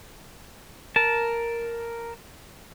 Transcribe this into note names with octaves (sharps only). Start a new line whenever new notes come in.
A#4 A5